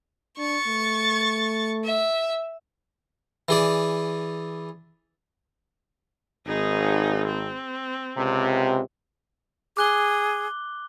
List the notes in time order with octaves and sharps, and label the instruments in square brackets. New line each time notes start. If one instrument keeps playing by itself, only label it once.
[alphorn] D4 [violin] C#6 A6
[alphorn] A3
[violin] E5
[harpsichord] E3 G#4 D5
[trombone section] G#1 [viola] D#4 G#4
[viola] C4
[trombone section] C#2 C3
[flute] G#4 [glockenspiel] D6 F#6 G7